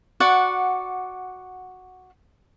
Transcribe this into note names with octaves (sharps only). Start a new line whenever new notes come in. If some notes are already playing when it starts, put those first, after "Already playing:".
F#4 D5 F#5